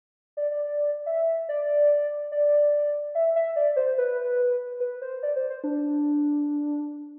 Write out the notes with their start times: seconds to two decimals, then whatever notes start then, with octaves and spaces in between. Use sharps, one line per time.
0.37 D5
0.51 D5
1.06 E5
1.49 D5
2.32 D5
3.15 E5
3.36 E5
3.56 D5
3.76 C5
3.98 B4
4.80 B4
5.02 C5
5.23 D5
5.36 C5
5.50 C5
5.64 D4